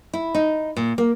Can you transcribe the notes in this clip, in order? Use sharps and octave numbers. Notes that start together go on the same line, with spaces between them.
E4
D#4
A#2
A#3